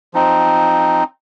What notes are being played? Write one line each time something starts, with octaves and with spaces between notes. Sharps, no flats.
F3 C4 D#4